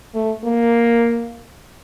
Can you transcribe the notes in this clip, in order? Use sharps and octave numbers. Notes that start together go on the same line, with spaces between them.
A3
A#3